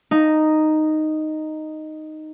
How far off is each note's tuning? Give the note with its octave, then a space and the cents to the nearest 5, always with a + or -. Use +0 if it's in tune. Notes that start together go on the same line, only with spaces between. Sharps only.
D#4 -5